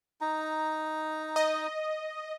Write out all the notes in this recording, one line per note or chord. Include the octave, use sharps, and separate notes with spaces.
D#4 A#5
D#5